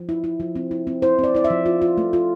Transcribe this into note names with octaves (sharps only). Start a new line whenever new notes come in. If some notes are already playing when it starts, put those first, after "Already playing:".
Already playing: F3
E4
E4
F3
C4
E4
C4
E4 C5
C4 D5
E4 D5
E5
F3
F4
F4
A3
F4